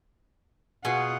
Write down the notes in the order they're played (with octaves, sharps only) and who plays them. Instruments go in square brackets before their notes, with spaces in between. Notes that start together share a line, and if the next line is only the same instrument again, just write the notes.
[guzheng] B2 [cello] F4 F#5 [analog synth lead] G#4